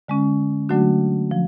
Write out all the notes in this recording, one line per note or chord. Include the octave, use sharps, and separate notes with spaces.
D3 G#3 C#4
D3 F#3 A3 D4 F#4
F3